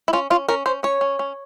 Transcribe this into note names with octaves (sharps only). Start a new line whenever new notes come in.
E4
C#4 F4
C#4 F4
C#4 A#4
C#4 C5
C#4 C#5
C#4
C#4